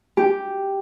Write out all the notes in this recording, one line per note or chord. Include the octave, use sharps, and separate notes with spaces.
G4